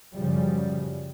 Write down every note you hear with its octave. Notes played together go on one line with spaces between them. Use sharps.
F#2 C#3 F3 G3